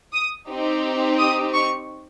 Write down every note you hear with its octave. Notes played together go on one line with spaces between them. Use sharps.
D#6
C4 D#4 G4
D#6
C#6